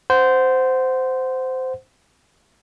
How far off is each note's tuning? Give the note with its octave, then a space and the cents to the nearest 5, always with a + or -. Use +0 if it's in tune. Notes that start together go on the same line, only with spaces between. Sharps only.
C5 -15 F#5 +0